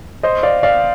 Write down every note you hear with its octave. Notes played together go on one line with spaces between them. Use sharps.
C5 D#5
D5 F5
D5 F5